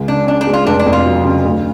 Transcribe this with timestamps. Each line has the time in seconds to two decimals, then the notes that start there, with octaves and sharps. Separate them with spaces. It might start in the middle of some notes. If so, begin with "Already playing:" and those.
Already playing: C#2
0.08 C#3 D4
0.27 C#4 D4
0.41 D4
0.47 G#3
0.53 F4
0.66 F1 D4
0.79 D4
0.86 F2
0.93 F4
1.06 F#3
1.25 C#3
1.45 D2